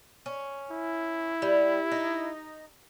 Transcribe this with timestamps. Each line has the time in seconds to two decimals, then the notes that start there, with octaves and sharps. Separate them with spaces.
0.26 C#4
0.71 E4
1.42 G3
1.92 D#4